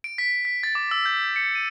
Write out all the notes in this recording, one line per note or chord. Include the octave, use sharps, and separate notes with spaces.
D7
B6
B6
A6
D6
E6
G6
C#7
D#7